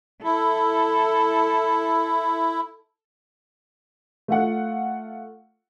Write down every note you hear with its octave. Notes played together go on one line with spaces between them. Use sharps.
E4 A4
A3 F4 F#5